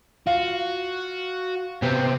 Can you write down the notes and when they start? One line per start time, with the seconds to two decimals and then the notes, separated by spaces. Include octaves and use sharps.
0.27 F4 F#4
1.82 C3 B3 C4 G4